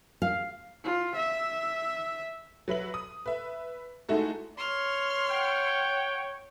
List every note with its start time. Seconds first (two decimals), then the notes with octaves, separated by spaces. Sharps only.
0.22 F5
0.84 F4
1.15 E5
2.68 F#3 B4 E5 F#7
2.94 D#6
3.26 B4 E5
4.09 G#3 A3 D#4 E4 F#4 A4
4.57 C#5 C6 F6
5.30 F#5 G5